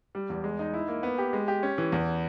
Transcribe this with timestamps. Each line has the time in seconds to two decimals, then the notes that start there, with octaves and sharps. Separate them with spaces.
0.15 G3
0.30 E2
0.44 G#3
0.59 D#4
0.74 E4
0.88 A#3
1.03 B3
1.18 G4
1.33 G#3
1.48 G4
1.63 C#4
1.78 E3
1.92 E2